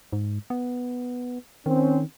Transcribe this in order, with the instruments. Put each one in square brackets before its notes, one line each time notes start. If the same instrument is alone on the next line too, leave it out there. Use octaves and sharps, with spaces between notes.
[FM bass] G#2
B3
[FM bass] D#3 [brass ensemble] C4 C#4